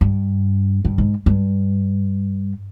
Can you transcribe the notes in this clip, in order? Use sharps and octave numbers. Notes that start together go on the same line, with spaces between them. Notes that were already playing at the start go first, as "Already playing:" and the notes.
G2
G2
G#2
G2